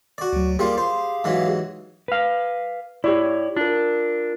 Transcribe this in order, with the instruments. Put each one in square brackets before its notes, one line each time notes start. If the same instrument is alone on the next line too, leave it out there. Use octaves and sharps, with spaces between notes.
[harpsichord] F#4 D5
[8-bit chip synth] D2 F#3
[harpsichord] G3 A#3 F4 [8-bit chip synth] G4 G#4 F5
[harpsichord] C5
G#2 E3 F#3
[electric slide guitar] B4 F5
[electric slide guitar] E4 C#5 [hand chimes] G4 D5
[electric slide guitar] D4 [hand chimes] F4 A#4